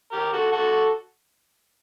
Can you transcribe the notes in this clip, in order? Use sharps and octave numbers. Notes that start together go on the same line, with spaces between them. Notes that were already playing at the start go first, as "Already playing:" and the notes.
G4 A#4
F#4 A4
F#4 A4